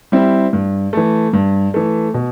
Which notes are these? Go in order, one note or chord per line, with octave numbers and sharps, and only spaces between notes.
G3 C4 E4
G2
E3 A3
G2
E3 A3
B2